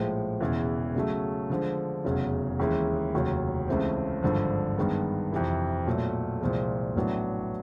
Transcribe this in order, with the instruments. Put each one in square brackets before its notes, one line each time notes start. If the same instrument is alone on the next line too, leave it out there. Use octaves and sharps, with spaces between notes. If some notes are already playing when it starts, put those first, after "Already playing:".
Already playing: [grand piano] A#1 A2 F3 G#3
E1 E2 C#3 E3
C#3 F#3 A3
D3 F3 G#3
F1 E2 C#3 F#3
D#2 C#3 E3 G#3
F1 D#2 C#3 F#3
C#2 C#3 E3 A3 C4
G#1 G2 D3 F3
G2 D#3 G#3 B3
F2 C3 E3
B1 A#2 F#3 A3
C2 A#2 F3 G#3
A1 A2 F#3 B3 D4